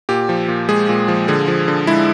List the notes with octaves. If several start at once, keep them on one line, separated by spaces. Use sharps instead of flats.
A#2 G4
F3
A#2
G#3 G#4
A#2
F3
D3 G#4
F3
D3
G#3 E4